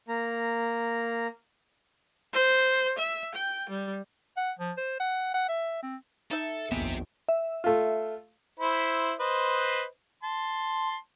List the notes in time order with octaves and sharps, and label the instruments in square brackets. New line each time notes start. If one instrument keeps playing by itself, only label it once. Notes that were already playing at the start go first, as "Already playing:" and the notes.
[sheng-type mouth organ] A#3 A#5
[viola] C5
E5
G5
G3
[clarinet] F#5
F3
C5
F#5
F#5
E5
C4
[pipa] D#4 E5 [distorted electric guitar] A4
[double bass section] F1 A#1 D#2 [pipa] G#3 [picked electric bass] B3 [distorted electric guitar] G4 E5
[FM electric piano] E5
[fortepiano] A3 F4
[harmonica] E4 C5 B5
B4 C5 D#5
A5 C6